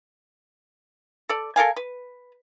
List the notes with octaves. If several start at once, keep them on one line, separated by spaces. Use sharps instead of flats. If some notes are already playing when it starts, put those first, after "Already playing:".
A4 D5
A4 A#4 F5 G#5
B4